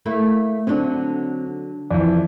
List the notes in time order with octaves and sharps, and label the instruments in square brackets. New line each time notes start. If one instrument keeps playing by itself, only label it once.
[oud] A3 A#3 E4
[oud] D3 F#3 [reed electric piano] C4 D4
[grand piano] F2 E3 [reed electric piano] D5